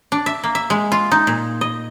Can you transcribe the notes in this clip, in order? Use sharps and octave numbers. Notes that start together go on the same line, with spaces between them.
D4
E5
A#3
E5
G#3
F4
D#4
A#2
D#5